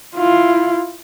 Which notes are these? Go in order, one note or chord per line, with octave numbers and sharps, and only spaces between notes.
E4 F4